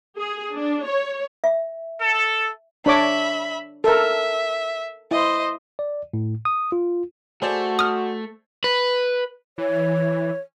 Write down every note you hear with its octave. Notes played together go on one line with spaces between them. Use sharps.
G#4
D4
C#5
E5
A4
D4 C#5 E5 B5 D6
A4 A#4 E5
E4 C5 D#5
D5
A2
D#6
F4
A3 F#4 G#4 C5 D5
D#6 F6
B4
E3 C#5